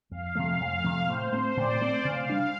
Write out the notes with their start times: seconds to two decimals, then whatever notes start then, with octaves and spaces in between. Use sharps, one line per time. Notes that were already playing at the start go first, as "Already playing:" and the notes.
0.11 F2 F5
0.35 C3 F3 A3
0.60 F2
0.84 C3 F3 A3
1.08 A2 C5
1.32 A3 C4
1.56 A2 D5
1.81 A3 C4
2.04 C3 F5
2.29 G3 D4